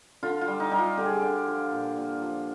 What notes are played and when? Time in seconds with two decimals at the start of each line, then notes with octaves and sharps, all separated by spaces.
0.23 D3 F4
0.41 F4
0.47 G3
0.60 D#4
0.71 G3 D#4
0.79 F4
0.97 D3 G4
1.06 G#4
1.14 G4
1.22 D3
1.47 F3
1.72 A#2
1.97 A#2
2.22 F3